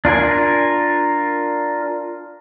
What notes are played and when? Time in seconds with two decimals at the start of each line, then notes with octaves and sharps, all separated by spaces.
0.05 D4 F4 A#4 G#5